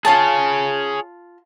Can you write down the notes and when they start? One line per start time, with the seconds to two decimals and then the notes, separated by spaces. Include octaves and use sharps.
0.05 F4 G#4 C#5 A5